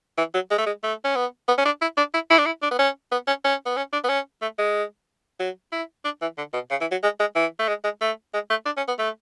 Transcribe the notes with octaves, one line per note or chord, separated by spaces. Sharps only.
E3
F#3
G#3
A3
G#3
A3
C#4
B3
B3
C#4
D4
E4
D4
E4
E4
D4
E4
D4
B3
C#4
B3
C#4
C#4
B3
C#4
D4
B3
C#4
A3
G#3
F#3
E4
D4
E3
D3
B2
C#3
E3
F#3
G#3
G#3
E3
A3
G#3
G#3
A3
G#3
A3
D4
C#4
B3
A3